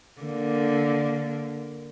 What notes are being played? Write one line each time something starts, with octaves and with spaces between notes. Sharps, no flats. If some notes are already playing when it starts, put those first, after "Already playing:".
D3 A#3